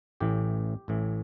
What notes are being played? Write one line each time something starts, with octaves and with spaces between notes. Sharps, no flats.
A1 A2 E3 G4
A1 A2 E3